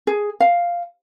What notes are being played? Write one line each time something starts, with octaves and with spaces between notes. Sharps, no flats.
G#4
F5